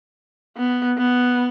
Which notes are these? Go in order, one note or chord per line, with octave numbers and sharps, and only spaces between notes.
B3
B3